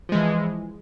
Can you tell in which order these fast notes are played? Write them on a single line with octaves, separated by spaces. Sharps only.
F3 G#3 E3